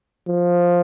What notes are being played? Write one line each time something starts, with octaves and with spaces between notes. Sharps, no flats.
F3